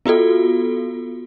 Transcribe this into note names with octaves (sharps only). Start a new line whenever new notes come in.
B3 F4 F#4 A4